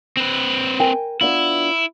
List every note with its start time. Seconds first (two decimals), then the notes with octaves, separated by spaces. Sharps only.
0.17 C4 B4
0.79 A#4 G5 G#5
1.21 B3 D4 E4 F4